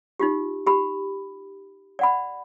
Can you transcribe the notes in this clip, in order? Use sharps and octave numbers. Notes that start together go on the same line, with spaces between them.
D#4 F4 G4
G4 B5
D5 F#5 B5